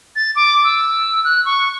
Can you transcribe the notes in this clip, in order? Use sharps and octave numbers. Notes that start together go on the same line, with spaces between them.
A6
D6
E6
F#6
C#6